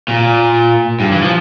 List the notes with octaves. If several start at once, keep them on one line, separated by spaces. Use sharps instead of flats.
A#2
G2
E3
F3